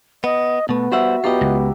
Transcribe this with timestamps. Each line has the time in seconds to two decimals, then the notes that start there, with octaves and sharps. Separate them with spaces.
0.24 B3 D#5
0.69 B2 A3 B3
0.92 G3 F#4 C5 E5 F#5
1.24 F#3 B3 F4 G4 D#5
1.41 C#2